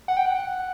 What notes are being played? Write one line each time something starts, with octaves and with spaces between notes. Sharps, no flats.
F#5
G5
F#5